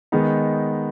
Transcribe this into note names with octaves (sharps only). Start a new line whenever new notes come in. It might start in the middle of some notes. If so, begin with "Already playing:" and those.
D#3 G#3 B3 D#4